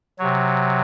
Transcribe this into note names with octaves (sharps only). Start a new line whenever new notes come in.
C3 F#3 C#5